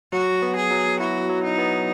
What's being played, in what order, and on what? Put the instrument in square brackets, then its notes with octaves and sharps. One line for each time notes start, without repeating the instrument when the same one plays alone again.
[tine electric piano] F#3 [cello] F#4
[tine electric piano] B3
[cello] G#4
[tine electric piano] F#3
[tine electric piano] E4 [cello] F#4
[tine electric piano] F#3
[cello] D#4
[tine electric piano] B3